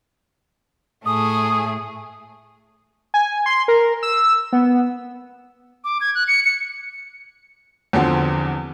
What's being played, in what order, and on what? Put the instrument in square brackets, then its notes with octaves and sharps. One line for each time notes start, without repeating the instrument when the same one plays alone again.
[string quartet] A2 A3 G#4 [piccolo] D#6
[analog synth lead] G#5
C6
A#4
E6
B3
[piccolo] D6
G#6
F#6
C#7
C#7
[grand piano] E2 D3 F3 C4 F#4